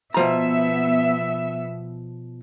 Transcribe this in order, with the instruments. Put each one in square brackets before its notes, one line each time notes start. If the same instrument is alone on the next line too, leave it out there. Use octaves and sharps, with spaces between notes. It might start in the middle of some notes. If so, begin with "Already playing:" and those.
[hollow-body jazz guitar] B2 F3 A#5 [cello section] B3 E5